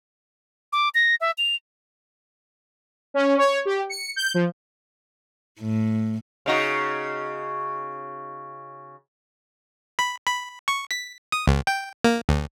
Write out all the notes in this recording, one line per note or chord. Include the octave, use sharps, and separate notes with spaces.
D6
A#6
E5
F7
C#4
C#5
G4
C#7
G6
F3
A2
C#3 D#4 F#4
B5
B5
C#6
B6
D#6
C#2
G5
A#3
D2